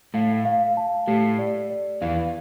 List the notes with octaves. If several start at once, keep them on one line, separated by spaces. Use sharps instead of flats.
A2 A3 F5
F5
A5
A2 A3 G4
D5
D5
E2 E3 F5